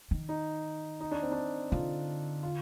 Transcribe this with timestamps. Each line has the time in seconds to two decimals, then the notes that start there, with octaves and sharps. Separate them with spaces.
0.11 D#3
0.29 D#4
1.00 D#4
1.11 D4
1.22 C4
1.32 D4
1.71 D3 F4
2.43 F4